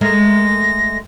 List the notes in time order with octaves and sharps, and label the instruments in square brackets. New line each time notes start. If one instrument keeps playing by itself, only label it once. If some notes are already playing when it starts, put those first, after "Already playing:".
[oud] G#3 A3 A#4 [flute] A#6